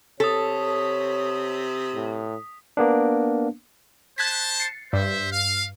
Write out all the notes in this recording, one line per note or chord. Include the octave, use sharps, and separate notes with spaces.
C3 A4 C#5 D#6 B6
A2
A#3 B3 D4
C5 A5 F#6 G#6 B6
A6 C7 C#7
G2 C5 E5
F5